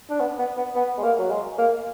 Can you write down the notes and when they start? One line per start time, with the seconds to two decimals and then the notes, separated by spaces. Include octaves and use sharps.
0.10 D4
0.20 B3
0.39 B3
0.57 B3
0.75 B3
0.98 G#3
1.03 A#3
1.19 F#3
1.31 G#3
1.58 A#3